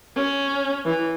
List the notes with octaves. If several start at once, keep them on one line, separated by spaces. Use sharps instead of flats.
C#4
E3